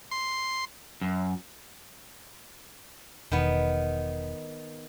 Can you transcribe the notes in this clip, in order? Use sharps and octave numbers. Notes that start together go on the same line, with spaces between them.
C6
F#2
E1 D#3 B3